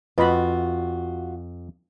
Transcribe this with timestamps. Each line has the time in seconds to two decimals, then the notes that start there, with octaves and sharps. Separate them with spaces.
0.18 F2 F4 F#4 B4 D#5 B5